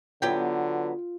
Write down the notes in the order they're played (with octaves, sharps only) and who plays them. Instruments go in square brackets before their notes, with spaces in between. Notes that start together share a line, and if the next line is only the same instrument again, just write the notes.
[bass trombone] D3 [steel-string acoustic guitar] F#3 B3 [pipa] E4 G4 G5 [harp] F4